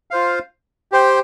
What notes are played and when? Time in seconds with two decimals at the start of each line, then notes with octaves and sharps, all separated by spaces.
0.11 F4 C5 F5
0.92 G4 C5 G5